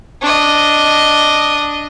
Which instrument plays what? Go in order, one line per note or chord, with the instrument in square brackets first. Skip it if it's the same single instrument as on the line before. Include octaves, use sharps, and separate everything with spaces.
[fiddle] D4 D#5